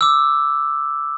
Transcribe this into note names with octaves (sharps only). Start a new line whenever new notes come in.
D6 E6